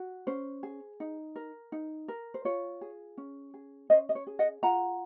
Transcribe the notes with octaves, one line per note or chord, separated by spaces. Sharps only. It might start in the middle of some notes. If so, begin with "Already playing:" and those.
Already playing: F#4
C#4 C5
G#4
D#4
A#4
D#4
A#4
C5
F4 C#5
G#4
C#4
G#4
C#4 C5 D#5
D#5
C#5
G#4
D#5 F#5
F4 F#5 A#5